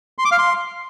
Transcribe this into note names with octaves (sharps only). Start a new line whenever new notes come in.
C6
D6
F5
C6